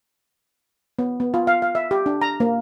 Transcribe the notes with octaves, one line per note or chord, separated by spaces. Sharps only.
B3
B3
F4
F5
F5
E5
G4
D4
A#5
A#3